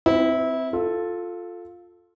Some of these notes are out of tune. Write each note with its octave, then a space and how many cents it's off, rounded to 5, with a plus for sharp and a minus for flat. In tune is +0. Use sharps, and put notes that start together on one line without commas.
C4 -10 E4 -20 B4 +40
F4 +10 A4 +0